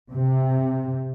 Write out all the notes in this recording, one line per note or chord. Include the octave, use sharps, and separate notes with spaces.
C3